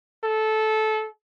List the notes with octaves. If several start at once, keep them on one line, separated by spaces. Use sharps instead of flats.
A4